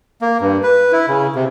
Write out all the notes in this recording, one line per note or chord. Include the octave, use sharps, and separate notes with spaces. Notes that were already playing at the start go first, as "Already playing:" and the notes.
A#3
G2
B4
E4
C#3
C3